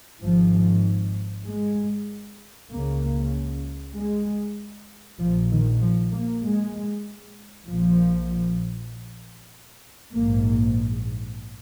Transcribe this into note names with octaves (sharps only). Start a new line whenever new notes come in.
G#1 G#2 F3
G#3
C#2 C#3 A#3
G#3
A#1 A#2 F3
D#3
F3
A#3
G#3
A#1 A#2 F3
A#1 G#2 A#3